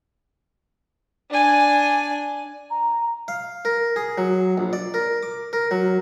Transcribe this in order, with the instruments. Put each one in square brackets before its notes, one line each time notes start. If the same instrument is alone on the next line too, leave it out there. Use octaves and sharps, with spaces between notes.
[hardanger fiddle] D4 G#5
[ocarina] A#5
[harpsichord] F5
A#4
G#4
F#3
A#1
D5
A#4
D6
A#4
F#3